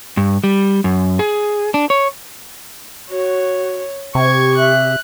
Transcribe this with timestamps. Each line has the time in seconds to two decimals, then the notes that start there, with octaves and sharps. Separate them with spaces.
0.17 G2
0.44 G3
0.84 F#2
1.19 G#4
1.74 D4
1.90 C#5
3.10 F#4 C#5
4.15 C3 G4 C#6 G#6
4.58 E5 F#6